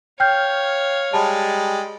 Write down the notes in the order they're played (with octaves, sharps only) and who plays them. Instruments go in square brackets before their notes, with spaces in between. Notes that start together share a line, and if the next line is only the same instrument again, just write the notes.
[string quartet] C#5 F5 [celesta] G5 F6 G6
[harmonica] G3 G#3 [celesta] A5